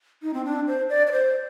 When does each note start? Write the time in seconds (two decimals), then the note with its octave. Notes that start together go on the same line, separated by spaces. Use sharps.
0.23 D#4
0.34 C4
0.45 D4
0.67 C5
0.89 D5
1.07 D5
1.12 C5